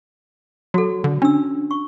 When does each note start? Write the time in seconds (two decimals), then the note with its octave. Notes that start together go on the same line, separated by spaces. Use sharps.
0.74 F#3 F#4 A4
1.04 D3
1.22 C#4 D4 E6
1.71 C#6